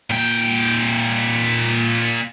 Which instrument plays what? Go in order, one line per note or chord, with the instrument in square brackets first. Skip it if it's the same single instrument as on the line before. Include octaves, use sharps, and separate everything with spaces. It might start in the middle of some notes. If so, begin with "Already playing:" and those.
[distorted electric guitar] A#2 G5